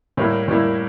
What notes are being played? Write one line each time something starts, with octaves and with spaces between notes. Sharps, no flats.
A2 G3 A#3 E4
A2 G3 A#3 E4